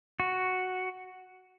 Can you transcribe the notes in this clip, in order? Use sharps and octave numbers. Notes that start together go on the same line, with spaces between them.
F#4